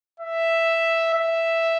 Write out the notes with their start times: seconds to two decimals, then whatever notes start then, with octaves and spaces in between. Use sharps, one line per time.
0.20 E5
1.14 E5